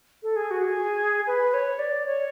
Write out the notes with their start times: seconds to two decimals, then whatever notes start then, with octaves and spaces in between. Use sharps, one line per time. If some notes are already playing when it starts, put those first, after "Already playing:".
0.23 A4
0.36 G#4
0.51 F#4
0.64 G#4
1.27 B4
1.54 C#5
1.79 D5
2.06 C#5